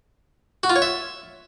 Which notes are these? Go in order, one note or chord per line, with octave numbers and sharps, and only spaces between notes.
F#4
F4
C#5
E5